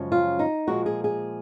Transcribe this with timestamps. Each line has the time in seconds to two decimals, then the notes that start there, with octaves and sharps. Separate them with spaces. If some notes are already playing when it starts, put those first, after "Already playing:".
Already playing: F#2 C#3 F3 G#3
0.12 F4
0.39 D#4
0.67 A#2 F3 G#3 F#4
0.86 G#4
1.04 G#4